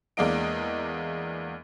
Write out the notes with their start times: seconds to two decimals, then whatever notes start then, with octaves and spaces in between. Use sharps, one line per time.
0.17 E2 G#3 A#3 D4 D#5 D7